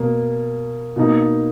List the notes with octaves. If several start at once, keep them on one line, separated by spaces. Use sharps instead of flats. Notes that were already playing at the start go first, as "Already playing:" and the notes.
Already playing: B2 A#3
B2 A#3 D#4